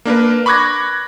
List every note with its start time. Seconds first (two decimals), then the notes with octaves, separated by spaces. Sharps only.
0.05 A#3 D4 A#4 B4
0.46 B5 C#6 D6 F#6 G#6 A#6